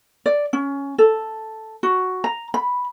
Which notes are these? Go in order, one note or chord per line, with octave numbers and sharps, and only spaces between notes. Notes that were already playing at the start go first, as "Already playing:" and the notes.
D5
C#4
A4
F#4
A#5
B5